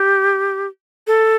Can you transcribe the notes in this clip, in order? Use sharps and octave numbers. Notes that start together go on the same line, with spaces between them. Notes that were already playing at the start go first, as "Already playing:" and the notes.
Already playing: G4
A4